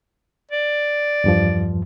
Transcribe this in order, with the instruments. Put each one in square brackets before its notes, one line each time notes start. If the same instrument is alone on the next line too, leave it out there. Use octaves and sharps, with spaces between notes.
[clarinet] D5
[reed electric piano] E2 G2 F3